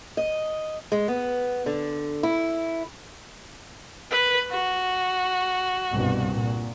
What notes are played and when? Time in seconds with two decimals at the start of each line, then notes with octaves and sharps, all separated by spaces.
0.17 D#5
0.92 G#3
1.08 B3
1.66 D3
2.23 E4
4.11 B4
4.51 F#4
5.92 C2 G2 B2
6.31 A#2